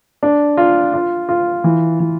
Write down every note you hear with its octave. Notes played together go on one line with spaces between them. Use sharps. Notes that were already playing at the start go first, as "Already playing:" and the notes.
D4
F4
F4
F4
E3
E3